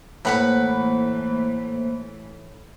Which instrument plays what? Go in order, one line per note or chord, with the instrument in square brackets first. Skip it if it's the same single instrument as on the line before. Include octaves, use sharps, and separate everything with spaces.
[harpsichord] A2 [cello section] E3 A3 [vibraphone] A#3 C5 [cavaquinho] B4 F#5 B5